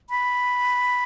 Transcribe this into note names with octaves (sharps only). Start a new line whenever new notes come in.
B5